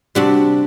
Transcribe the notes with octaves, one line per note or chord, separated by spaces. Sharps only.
C3 G3 D4 F#4